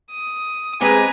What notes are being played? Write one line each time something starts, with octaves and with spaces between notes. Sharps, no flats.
D#6
G#3 C4 G4 B4 G#5 A#5